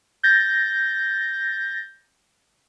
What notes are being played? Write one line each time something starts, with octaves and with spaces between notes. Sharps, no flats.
G6 A6 A#6